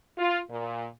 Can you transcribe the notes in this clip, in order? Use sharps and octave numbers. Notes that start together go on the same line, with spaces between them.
F4
A#2